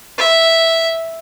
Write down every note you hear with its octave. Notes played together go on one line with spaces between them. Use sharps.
E5